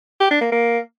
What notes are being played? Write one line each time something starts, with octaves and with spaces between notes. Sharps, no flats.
G4
D4
A#3
A#3